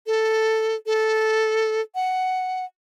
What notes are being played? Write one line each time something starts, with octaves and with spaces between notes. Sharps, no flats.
A4
A4
F#5